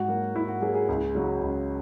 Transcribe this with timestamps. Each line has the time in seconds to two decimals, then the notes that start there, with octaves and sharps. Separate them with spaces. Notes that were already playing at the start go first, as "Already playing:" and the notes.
Already playing: G#2 F#4
0.08 F#3 A#3
0.35 G#2 E4
0.49 F#4
0.62 F#3 A#3 G#4
0.75 G#4
0.89 C#2
1.15 C#3 F#3
1.41 C#2